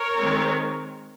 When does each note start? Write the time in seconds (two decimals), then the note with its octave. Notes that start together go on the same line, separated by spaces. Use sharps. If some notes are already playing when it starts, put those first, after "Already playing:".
Already playing: A#4 C#5
0.18 D#3 G#3 C4